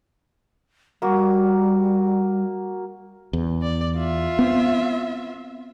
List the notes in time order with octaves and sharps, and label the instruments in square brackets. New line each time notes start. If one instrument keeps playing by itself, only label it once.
[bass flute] G3 [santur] A#3 F#4
[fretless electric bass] E2
[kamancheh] D5
F4 E5
[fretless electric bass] B3 C4